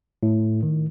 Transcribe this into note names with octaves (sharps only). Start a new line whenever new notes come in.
A2
D#3